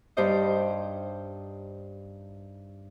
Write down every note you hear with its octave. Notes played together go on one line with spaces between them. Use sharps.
G2 D#4 G4 C5 D#5